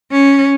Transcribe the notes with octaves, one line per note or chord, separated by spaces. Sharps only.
C#4